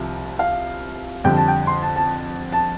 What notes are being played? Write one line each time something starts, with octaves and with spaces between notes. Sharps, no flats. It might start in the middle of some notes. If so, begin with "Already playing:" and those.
Already playing: C2 C3 F3
F5
F2 D3 G3 G5
A5
G5
C6
A5
A5
A5